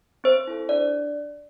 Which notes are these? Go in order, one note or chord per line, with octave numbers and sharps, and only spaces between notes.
C4 C5
E4 A4
D4 D5